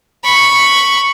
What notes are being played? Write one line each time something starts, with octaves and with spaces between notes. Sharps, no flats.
B5 C#6